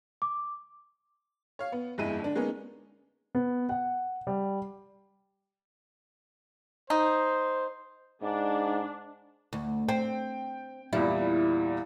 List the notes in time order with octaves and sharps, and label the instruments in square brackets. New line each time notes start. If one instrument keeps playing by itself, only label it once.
[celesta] D6
[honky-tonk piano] C#5 F5
B3
G1 F2 G#3 E4 D#7
D3 D4
G#3 A#3 B3 C#4 D#4
[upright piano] B3
F#5
G3
[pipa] D#4 [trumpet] C5
[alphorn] G#2 [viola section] D4
[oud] D2
[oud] C4 [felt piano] G5
[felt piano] E2 A#2 G3 [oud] E4